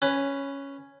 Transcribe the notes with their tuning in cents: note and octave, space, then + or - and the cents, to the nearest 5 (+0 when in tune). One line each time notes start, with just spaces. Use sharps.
C#4 +0 B4 +5